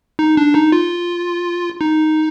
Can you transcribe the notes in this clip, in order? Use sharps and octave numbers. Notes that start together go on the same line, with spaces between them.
D#4
D4
D#4
F4
D#4